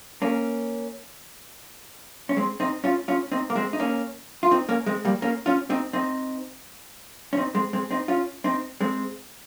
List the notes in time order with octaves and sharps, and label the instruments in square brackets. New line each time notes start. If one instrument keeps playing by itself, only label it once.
[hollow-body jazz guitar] A#3 C#4
C#4
G#3 C4
C4 D#4
C#4 F4
C#4 F4
C4 D#4
A#3
G#3 C4
D#4
A#3 C#4
F4
C4 D#4
A#3 C#4
G#3 C4
G3 A#3
A#3 C#4
C#4 F4
C4 D#4
C4 D#4
C#4
C4 D#4
G#3 C4
G#3 C4
C4 D#4
C#4 F4
C4 D#4
G#3 C4